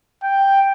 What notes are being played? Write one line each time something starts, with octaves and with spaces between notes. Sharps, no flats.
G5